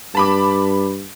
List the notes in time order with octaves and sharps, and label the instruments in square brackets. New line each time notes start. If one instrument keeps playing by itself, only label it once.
[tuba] G2 [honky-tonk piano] A5 B5 D6